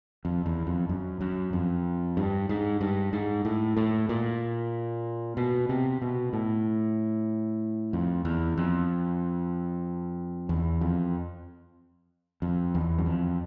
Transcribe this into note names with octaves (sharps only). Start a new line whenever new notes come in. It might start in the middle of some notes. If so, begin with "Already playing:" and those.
F2
E2
F2
F#2
F#2
F2
G2
G#2
G2
G#2
A2
A2
A#2
B2
C3
B2
A2
F2
E2
F2
E2
F2
F2
E2
F#2
F2